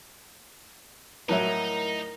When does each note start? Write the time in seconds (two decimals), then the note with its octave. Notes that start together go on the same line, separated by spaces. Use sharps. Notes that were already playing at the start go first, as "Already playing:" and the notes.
1.29 A2 F#3 D#4 E4 A#4